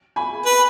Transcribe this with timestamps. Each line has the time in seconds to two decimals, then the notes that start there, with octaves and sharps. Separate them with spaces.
0.16 G#5 B5
0.45 B4